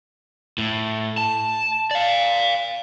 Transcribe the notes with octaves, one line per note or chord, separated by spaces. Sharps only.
A2
A5
D5 F5